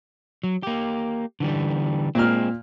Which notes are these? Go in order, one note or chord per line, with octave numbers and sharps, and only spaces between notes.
F#3
A#3 G4
D3 E3 G3
A#2 G#3 C4 F6